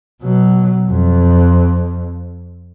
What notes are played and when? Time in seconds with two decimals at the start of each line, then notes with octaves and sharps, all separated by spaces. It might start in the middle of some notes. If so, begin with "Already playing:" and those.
0.22 B2 F#3
0.90 F2